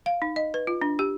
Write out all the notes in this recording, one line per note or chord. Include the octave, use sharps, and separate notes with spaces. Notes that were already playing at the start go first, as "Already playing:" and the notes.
F5
D#4
D#5
B4
F4
D4
G4